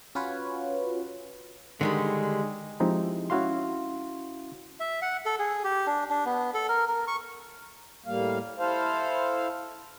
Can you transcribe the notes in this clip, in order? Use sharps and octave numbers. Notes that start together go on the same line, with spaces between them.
C#4 F4 F#4 B4 C#5
D3 D#3 G3 G#3
F3 G#3 C4 D#4 E4 G4
C#4 E4 F#4 F5 C6
E5
F#5
A4
G#4
G4
D4
D4
B3
A4
A#4
A#4
C#6
A2 G3 A#3 F5
E4 A4 C5 F5